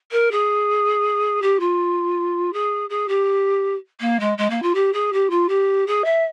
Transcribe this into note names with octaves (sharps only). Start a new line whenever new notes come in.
A#4
G#4
G4
F4
G#4
G#4
G4
A#3
G#3
G#3
A#3
F4
G4
G#4
G4
F4
G4
G#4
E5